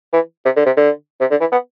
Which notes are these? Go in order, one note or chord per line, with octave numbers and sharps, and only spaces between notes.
E3
C3
D3
C3
D3
C3
D3
E3
B3